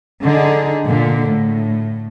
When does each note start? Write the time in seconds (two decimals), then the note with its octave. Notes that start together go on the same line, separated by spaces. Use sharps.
0.23 D3 D#4 G#4
0.87 A#2 D3
1.29 A2